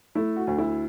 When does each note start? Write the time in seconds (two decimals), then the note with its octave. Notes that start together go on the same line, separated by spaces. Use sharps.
0.15 A3 E4
0.36 F#4
0.47 D2
0.58 E4